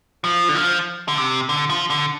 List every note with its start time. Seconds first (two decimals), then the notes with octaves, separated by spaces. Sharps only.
0.24 F3
0.49 D3
0.55 F3
1.08 D3
1.18 C3
1.49 D3
1.70 F3
1.90 D3